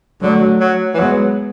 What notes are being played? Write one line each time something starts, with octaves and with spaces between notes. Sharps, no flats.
D3 F#3 A3
F#3
E3
F#3 G#3 B3